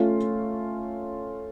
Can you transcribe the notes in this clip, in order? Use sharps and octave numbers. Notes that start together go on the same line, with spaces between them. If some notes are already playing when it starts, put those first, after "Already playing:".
Already playing: A3 C#4 F4